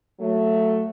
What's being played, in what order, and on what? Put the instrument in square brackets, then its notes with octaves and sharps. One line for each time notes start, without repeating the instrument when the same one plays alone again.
[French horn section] F#3 A3